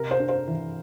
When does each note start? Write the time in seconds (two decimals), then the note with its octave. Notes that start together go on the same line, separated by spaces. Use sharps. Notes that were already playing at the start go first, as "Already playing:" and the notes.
Already playing: C3 A#4
0.11 C5
0.20 D4
0.29 C5
0.48 E3